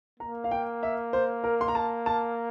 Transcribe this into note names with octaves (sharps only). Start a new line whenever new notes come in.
A#3 A#5
F5
G5
E5
C5
A#4
C6
A#5
A5
A5